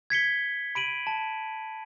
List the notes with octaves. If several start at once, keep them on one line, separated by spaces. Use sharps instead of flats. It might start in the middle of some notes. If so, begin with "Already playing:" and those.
G#6 B6 C#7 G7
B5 D7 D#7 F#7
A5